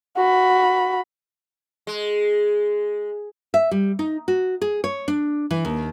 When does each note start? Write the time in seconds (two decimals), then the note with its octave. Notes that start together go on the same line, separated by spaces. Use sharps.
0.17 F#4 B5
1.87 G#3
3.54 E5
3.71 G3
3.99 D#4
4.28 F#4
4.62 G#4
4.84 C#5
5.08 D4
5.51 E3
5.65 D#2